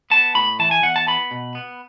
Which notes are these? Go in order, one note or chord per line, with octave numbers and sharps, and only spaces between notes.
B3 A5
A2 B5
E3 A5
G#5
E2 F#5
A5
B3 B5
B2
B3